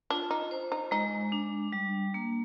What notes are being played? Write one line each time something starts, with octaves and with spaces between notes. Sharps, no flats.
D4 F4
D#4
C5
D#4
G#3 D#4
D4
G3
A#3